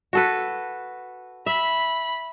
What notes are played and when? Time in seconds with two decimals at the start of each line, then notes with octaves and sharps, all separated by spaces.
0.13 F#4 A4 B4
1.46 E5 B5